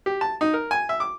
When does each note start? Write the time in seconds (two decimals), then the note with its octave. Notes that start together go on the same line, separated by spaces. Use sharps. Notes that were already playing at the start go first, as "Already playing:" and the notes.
0.06 G4
0.21 A5
0.41 D#4
0.54 A#4
0.71 G#5
0.89 E5
1.00 D6